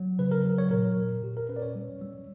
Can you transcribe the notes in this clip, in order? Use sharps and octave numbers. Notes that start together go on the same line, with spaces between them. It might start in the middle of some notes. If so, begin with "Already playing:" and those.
Already playing: F#3
C#3 B4
A#4
F#3
C#5
A#2 A#4
A#2
A#2 G4
A#4
C#4 B4
D5
C#5
G3
G3